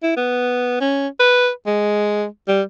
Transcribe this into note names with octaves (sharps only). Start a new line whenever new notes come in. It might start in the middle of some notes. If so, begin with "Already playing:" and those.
E4
B3
C#4
B4
G#3
G3